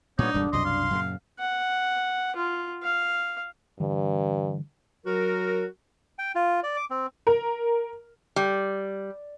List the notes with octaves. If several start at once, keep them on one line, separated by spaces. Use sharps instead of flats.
A#2 G3 B3 D4 D#4 C#5 D5 D#6
E1 G2 D3 G3
C2 F#2 B2 D#5 C6
F5
F#2 A#2 C#3
F#5
F4
F5
G2 D3 E3 G3
F#3 F#4 A#4
G5
F4
D5
D6
C4
A#4
G3